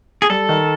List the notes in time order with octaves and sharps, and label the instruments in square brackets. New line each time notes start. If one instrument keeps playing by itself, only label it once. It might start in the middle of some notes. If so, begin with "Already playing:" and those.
[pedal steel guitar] G#4
[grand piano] G3 [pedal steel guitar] A4
[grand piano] D#3